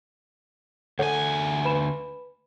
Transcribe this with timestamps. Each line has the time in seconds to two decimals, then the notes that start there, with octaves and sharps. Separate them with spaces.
0.99 D2 A4 C#5 F#5 G#5
1.65 B4 B5 E7